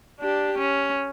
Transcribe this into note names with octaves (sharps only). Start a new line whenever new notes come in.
D4 G4
C#4